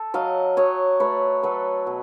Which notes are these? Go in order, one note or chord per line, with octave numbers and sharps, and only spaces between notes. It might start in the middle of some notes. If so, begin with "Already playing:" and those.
Already playing: A4
F#3 D#5 F5
F#3 C#5 D#5
A3 B4 C#5
F#3 A4 B4
B2